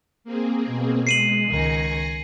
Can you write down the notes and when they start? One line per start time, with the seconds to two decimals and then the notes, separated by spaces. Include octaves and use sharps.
0.24 A#3 C4 G#4
0.67 B2
1.07 G#3 C7 D#7 F#7
1.48 C#2 D#3 G#5 A#6 C#7